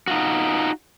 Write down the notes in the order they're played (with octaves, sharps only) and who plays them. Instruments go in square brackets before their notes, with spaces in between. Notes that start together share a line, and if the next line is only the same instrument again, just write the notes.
[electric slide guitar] D#4 F4 F#4